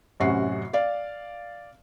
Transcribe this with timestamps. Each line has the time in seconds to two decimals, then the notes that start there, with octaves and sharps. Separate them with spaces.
0.20 A1 F#2 C3 C#4 F#4 C7
0.73 D5 F5